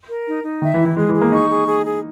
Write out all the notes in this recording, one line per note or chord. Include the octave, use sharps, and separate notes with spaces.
A#4
D#4
D#4
D#3 E5
E3
E4
E3
G#3 G#4
E3
G#4
A#3
D#4 C#6
G#4
G#4
G#4